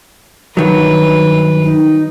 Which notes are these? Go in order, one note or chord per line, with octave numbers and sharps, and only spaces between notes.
G2 D#3 F#3 B4
D#4